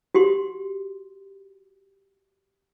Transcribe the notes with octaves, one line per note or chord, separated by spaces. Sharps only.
F#4 G4 C6